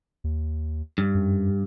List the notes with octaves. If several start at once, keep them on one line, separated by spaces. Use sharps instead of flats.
D#2
G2
F#2